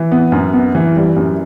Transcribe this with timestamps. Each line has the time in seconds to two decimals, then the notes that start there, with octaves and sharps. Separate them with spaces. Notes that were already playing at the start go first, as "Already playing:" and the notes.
Already playing: E3
0.12 B3
0.32 F#2
0.53 B3
0.75 E3
0.96 G3
1.16 F#2